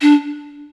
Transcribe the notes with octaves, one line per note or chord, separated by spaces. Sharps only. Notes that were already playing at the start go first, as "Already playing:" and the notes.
D4